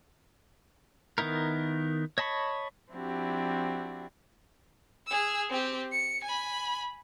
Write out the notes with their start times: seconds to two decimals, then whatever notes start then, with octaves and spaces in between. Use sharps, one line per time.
1.18 D#3 B3 D#4 E4 A#4
2.18 C#5 D#5 A5 B5 C#6
2.92 F3 C4 D4 E4 F#4 G4
5.07 G#4 E6
5.49 C4 G4
5.92 C#7
6.24 G#5 B5